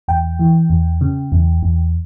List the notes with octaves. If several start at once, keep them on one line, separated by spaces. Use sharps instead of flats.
E2 G5
E3
E2
C#3
E2
E2